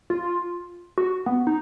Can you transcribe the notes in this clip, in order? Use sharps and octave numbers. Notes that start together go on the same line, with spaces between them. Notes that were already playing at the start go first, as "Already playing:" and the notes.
F4
F#4
B3
D#4